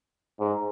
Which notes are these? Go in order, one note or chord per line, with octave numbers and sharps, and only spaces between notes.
G#2